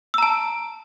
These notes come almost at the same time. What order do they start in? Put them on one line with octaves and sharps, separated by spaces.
E6 A#5 A5